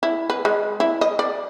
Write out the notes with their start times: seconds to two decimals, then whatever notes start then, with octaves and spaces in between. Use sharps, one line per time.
0.03 E4
0.30 B4
0.45 G#3
0.80 E4
1.01 D#5
1.19 D5